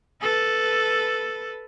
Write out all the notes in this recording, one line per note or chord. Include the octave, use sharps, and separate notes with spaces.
A4 B4